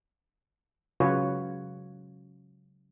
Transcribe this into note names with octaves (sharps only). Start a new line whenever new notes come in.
C#3 F#3 F4 F#4 B4 C#5